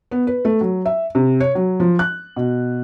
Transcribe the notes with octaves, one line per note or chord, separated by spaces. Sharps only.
B3
B4
A3
F#3
E5
C3
C#5
F#3
F3
F#6
B2